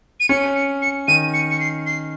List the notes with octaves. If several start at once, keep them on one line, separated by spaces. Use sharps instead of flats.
D#7
C#4 C#7
C#7
C#7
D#3 D#7
C#7
C#7
C7
C7